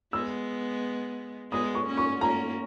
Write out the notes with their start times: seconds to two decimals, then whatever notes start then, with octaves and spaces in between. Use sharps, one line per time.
0.13 G#3 B3 E6
1.51 G#3 B3 D#6
1.75 C#6
1.86 A#3 C#4
1.98 C#6
2.21 A#3 C#4 A#5